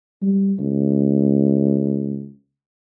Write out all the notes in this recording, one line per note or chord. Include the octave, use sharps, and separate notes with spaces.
G3
C#2